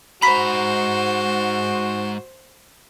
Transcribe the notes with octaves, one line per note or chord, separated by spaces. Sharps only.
G#2 F#4 C5 A#5 B5 B6